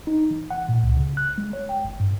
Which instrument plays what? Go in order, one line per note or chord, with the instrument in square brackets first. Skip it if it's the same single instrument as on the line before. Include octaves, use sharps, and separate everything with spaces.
[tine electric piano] D#4
E3
F#5
A#2
C#2
C#3
F#6
G#3
C#5
G5
G1
G2